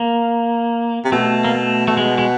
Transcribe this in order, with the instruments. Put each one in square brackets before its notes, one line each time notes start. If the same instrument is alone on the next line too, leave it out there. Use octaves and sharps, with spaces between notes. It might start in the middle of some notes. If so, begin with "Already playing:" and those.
Already playing: [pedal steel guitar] A#3
[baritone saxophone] C3
[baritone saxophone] B2 [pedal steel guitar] A3
[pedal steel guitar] A#3
A3
A3
G#3
G#3